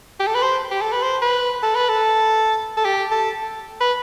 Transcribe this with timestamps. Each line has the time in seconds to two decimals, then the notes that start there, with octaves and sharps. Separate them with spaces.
0.20 G4
0.27 A4
0.35 B4
0.42 C5
0.71 G4
0.81 A4
0.92 B4
1.03 C5
1.22 B4
1.63 A4
1.75 B4
1.89 A4
2.77 A4
2.85 G4
3.11 A4
3.81 B4